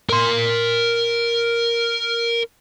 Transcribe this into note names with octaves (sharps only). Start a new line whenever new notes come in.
A#4 C6